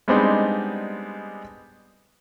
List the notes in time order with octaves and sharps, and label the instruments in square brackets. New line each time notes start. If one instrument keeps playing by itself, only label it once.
[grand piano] G3 G#3 B3 C4 D4 D#4